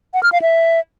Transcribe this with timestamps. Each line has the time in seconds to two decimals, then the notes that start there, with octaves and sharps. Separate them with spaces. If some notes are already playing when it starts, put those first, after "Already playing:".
0.14 F#5
0.23 F6
0.32 F5
0.42 E5